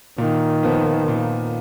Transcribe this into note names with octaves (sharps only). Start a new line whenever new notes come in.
A#2 D#3
F3 B3
A#2